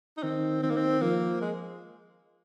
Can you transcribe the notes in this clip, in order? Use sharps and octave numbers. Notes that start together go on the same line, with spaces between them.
D#4
D#3 C4
D#3 C4
A#3
C4
F3 A#3
G#3